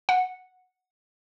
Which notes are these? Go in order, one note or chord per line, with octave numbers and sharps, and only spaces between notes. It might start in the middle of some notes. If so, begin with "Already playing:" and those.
F#5